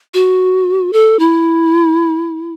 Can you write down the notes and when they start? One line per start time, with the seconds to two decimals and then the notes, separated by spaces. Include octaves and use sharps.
0.14 F#4
0.93 A4
1.19 E4